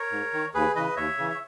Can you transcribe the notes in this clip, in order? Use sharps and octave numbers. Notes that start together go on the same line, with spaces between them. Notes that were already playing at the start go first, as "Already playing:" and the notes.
Already playing: A#4 C#5
G#2
D#3
D#2 G#4 B4
C#3 E3 B4 D#5
D#2 C#5 E5
C#3 E3
E5